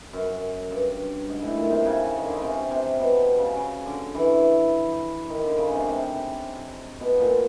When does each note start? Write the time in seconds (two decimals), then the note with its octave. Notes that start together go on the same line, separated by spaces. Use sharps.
0.13 F#2
0.71 G2
1.29 G#2
1.42 A2
1.57 A#2
1.70 C3
1.85 C#3
2.16 D#3
2.26 D3
2.34 C#3
2.42 C3
2.71 C3
3.00 B2
3.39 C#3
3.57 C#3
3.86 D3
4.15 E3
5.29 D#3
5.44 D3
5.58 C#3
5.72 C3
5.86 C3
7.00 B2
7.20 A#2